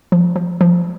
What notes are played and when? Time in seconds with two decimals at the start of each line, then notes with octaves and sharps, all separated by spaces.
0.12 F3
0.36 F3
0.61 F3